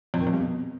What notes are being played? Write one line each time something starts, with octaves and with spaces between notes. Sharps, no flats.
F2
D#3
F2
G2
B2